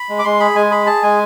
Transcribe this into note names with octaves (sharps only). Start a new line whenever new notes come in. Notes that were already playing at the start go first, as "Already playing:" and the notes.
Already playing: B5
G#3
D6
G#3 C6
G#4 B5
G#3 G#5
G#4 B5
G#4 A5
G#3 G#5